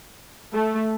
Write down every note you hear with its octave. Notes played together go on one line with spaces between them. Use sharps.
A3